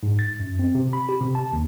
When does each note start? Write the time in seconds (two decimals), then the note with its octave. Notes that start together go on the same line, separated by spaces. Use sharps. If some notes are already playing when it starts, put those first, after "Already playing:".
0.03 G#2
0.19 A6
0.40 F#2
0.59 C4
0.75 C3
0.93 B5
1.09 G4
1.20 C3
1.35 A5
1.53 D#2